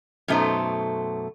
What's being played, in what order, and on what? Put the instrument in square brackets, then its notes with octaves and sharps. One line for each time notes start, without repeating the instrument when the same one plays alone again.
[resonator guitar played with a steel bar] F#2 B2 A3 D#4 C5